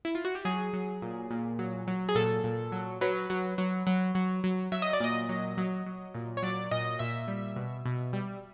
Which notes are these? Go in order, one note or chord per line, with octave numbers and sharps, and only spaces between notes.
E4
F4
F#4
G4
F#3 G#4
F#3
A#2
A#2
F#3
F#3
G#4
A#2 A4
A#2
F#3
F#3 B4
F#3
F#3
F#3
F#3
F#3
F#3 E5
D#5
D5
A#2 D#5
F#3
F#3
F#3
A#2
C#5
F#3 D5
A#2 D#5
A#2 E5
G3
B2
B2
G3